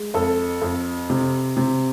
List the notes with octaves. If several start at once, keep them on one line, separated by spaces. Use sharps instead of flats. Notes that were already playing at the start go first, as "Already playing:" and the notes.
Already playing: G#3
F2 A4
F2
C3
C3